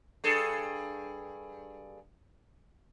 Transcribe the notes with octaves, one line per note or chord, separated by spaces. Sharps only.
G2 G#4 A4